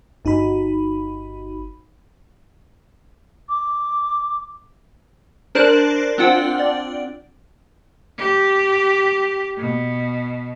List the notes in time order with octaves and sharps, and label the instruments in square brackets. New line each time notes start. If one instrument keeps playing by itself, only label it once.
[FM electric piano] G1 D#4 F#4 B5
[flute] D6
[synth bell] D4 A#4 C5 D5 A5 F#6
C4 D4 F4 F#5 G5
D5
[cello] G4
B2